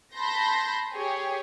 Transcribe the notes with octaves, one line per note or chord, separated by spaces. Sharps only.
A5 B5 C6 G6 A#6
G4 G#4 C#5